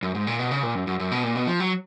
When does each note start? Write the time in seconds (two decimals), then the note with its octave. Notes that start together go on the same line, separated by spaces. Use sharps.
0.03 F#2
0.15 G#2
0.27 A#2
0.39 B2
0.51 C#3
0.63 A#2
0.75 F#2
0.87 F#2
0.99 F#2
1.11 B2
1.23 A#2
1.35 B2
1.47 F3
1.60 F#3